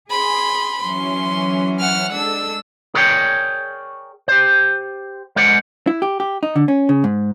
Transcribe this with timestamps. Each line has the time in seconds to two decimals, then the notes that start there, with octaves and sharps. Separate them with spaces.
0.10 G#4 B5 C6
0.82 E3 F#3 C#4 C6
1.80 F#5 F6
2.12 G#3 D4 A4 E6
2.95 G#4 A#4 C#5 D5 F5 G5
4.28 G4 C5
5.36 G#3 A#4 C5 D5 F#5
5.87 E4
6.02 G4
6.20 G4
6.43 D#4
6.56 D3
6.68 C#4
6.89 C#3
7.04 G#2